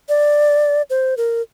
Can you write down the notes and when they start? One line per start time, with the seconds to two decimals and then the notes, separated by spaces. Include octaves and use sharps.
0.09 D5
0.90 C5
1.17 A#4